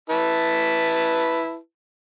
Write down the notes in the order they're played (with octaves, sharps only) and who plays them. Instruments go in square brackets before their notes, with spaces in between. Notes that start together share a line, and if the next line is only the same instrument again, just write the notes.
[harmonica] E4 B4 A5